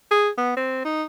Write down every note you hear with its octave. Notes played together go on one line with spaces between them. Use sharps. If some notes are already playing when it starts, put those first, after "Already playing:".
G#4
B3
C4
D#4